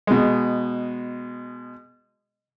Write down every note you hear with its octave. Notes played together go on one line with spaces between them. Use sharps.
B2 G#3